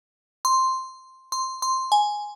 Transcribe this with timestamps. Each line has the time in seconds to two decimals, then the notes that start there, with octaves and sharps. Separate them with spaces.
0.45 C6
1.32 C6
1.62 C6
1.92 G#5